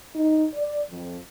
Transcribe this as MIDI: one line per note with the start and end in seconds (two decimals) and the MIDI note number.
0.15 0.43 63
0.55 0.80 74
0.89 1.17 41